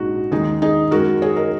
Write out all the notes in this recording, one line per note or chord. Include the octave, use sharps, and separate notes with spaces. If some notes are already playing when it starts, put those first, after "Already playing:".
Already playing: A#1 G#2 G#3 D#4 F#4
D#2 D#3 G#3 D#4 G#4
D#4 G#4
F#2 D#3 G#3 F#4 A#4
G#4 C#5
A#4 D#5